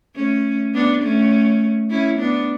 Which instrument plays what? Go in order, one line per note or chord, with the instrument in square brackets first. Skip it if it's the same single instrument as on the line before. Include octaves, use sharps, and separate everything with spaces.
[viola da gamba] A3 C#4
B3 D4
A3 C#4
C#4 E4
B3 D4